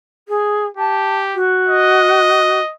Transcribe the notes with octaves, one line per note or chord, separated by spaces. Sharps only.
G#4
G4 A5
F#4
D#5